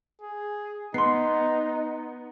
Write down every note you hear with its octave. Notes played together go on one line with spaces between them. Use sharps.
G#4
B3 D#4 C6 C7